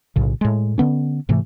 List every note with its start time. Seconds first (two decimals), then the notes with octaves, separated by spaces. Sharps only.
0.16 B1 A2 C#3
0.41 A2 G#3
0.78 D3 B3 C#4
1.29 G#2 C3 E3 A3